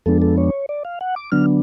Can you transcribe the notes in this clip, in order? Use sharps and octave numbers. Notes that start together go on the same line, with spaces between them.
F2 F3 G#3 B3 D4 A4
A4
C#5
D5
F5
F#5
D6
D3 F#3 B3 D4 F6